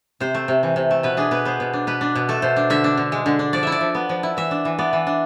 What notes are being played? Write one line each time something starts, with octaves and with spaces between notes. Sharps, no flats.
C3 C5
A3
C3
E3
C3
A3
B2 B4
D4 G#4
B2 B4
B3 C5
B2
D4
B2 B4
D4
B2
A3 A4
B2 C5
D4
D3 E5
D4
D3
G#3
D3
D4
F3 D5
E4 E5
D5
F3
B3
F3
E4
E3 E5
D4
E3
B3 D5
E3
D4